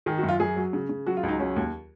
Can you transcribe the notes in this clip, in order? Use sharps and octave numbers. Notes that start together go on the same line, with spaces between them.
D#3 G#4
F#4
F#2
F4
F#2 G#4
F#3
C#3
C#3
F#3 F#4
F4
C#2
D#4
F#3 C#4
D#2